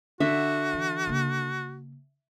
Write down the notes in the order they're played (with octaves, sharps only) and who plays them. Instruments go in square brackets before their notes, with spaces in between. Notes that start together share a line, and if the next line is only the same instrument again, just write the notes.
[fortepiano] D3 [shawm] F#4 [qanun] E5
[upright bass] E3
C#3 A#3